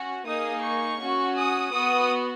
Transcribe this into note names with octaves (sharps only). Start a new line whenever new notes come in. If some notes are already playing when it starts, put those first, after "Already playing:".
Already playing: C#4 F#4
A#3 D#4 G#4 D#6
C#6
C#4 F#4
D#6
B3 F#4 D#6